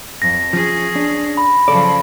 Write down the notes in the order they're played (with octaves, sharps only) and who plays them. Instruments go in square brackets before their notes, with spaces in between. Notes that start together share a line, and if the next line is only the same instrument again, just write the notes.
[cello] F2 [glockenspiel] A#6
[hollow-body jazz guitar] F3 [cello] C#4 G#4
[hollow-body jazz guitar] D4
[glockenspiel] B5
[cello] C#3 F3 [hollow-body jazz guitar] A4 D5